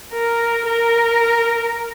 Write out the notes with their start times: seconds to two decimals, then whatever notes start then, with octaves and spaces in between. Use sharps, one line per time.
0.13 A#4
0.66 A#4